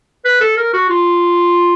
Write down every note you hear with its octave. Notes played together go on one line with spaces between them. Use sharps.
B4
A4
A#4
F#4
F4